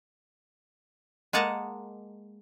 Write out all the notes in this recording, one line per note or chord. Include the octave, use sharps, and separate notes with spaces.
G#3 A#3 D#5 F#5 A5 A#5